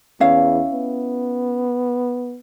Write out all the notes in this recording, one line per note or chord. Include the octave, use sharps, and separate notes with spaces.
E2 C#4 E4 F5
B3